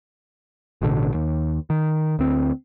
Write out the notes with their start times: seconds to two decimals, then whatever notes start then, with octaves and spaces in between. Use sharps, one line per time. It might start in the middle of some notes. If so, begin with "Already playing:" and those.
0.82 A1 B2 D3
1.14 D#2
1.70 D#3
2.19 D2 C4